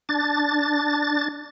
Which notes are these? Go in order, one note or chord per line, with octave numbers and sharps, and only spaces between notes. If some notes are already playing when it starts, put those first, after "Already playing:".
D4 A6